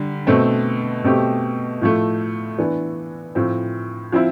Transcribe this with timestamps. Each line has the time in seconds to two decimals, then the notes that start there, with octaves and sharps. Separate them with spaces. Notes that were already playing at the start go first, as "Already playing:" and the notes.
Already playing: D3 G3
0.27 B2 A3 C4
1.04 B2 A3 C4 G4
1.81 A2 F3 A3
2.59 E3 B3 D4
3.35 A2 F3 C4
4.12 F3 C4 E4